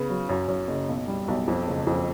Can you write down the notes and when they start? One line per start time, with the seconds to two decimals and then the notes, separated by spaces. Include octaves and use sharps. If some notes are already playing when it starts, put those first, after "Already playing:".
Already playing: C#3 B3
0.10 F#3
0.29 F#2
0.48 F#2
0.68 F#1
0.89 B1
1.08 G3
1.28 B1
1.48 F2
1.67 F#1
1.87 F2